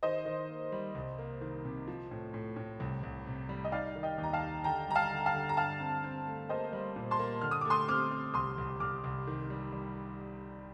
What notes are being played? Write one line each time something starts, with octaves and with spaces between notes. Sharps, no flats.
D#3 C5 D#5
D#3
A#3
G3
C2
A#3
D#3
C3
F3
A2
A2
A2
C2
C2
C3
G3
D#5
D#4 D5 F5
D#3
D#5 G5
D#2
A#5
F5 A5
D#4
D3 G5 A#5
G3 A#5
F5 A5
D3
F5 A5
D3
A#5
G2 F5 A5
C4
C4
A3
A#3 C5 D#5
G3
A#2
A5 C6
A#3
D3 F6
D#6
A3 D6
C6 D#6
C4 D6 F6
C4
C2 C6 D#6
C2
C2 D6 F6
C2
D#3
G3
G3